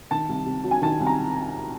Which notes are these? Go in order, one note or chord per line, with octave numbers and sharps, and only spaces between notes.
D#3 A5
C2
C3
F#3
G#5
D#3 A5
C2
A#5